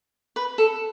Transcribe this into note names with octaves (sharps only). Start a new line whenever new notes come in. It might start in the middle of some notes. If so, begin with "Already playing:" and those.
B4
A4